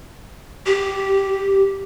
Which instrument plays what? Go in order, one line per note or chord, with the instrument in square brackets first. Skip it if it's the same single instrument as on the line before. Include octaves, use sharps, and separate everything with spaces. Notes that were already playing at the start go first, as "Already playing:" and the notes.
[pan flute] G4